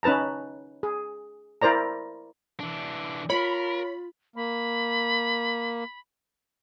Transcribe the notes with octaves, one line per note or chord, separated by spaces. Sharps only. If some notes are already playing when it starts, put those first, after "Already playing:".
C#4 D#4 B4 A5 A#5
G#4
E4 A#4 C5 D5 A#5
E3 D4
F4 A#4 C#5 B5
A#3 B5